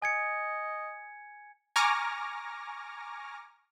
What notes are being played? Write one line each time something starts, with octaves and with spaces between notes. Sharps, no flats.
D#5 G#5 G#6 C#7
G#5 A#5 C#6 D6 F6 A#6